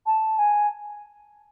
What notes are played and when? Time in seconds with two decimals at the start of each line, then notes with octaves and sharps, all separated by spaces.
0.06 A5
0.39 G#5